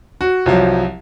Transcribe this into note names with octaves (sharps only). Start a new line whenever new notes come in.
F#4
C2 F3 F#3